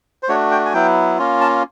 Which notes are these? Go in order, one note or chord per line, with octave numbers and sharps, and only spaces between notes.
C5
A3 D4 F#4 C#5
G5
G#5
F#3 B3 E4 G5
A#3 C#4 F4
A5